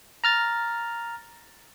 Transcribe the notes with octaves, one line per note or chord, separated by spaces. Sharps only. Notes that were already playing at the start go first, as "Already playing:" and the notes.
A#5 F6 A6